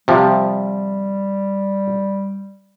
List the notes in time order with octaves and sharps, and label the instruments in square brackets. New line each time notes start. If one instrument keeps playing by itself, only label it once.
[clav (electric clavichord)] C3 F3 [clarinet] G3